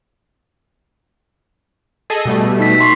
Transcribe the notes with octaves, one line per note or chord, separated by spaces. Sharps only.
G#4 A4 D#5
B2 G3 A3
D#4 B6
C6 C#6 C7